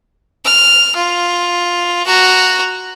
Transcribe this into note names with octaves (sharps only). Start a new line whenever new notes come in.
F6
F4
F#4 A#5